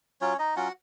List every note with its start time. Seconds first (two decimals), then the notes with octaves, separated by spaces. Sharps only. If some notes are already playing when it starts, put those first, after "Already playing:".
0.21 F#3 C#4 F4 C#5
0.39 D#4 D#5
0.56 F#3 C#4 F4 F#4 F#5